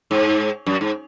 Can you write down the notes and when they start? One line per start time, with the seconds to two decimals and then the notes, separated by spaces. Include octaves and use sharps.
0.11 G#2
0.66 F#2
0.81 G#2